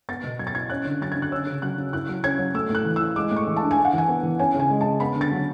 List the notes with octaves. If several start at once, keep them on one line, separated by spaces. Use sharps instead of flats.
B3 A6
B2
F#3 G#6
A6
E4 G#6
C#4 F#6
D3
F#3 A6
D3 G#6
F#6
C#4 E6
C#3
F#3 F#6
C#3
E4 F#6
F#3
C#4 G#6
F#3
A3 E6
A2 F#6
E3
E4 E6
G#3 D6
A2
C#6
E3
A5
D4
G#5
E4
F#5
E3 G#5
B3
E3
C#4 G#5
C#3
G#5
G#3
C#3 A5
B3 B5
D3
A6
F#3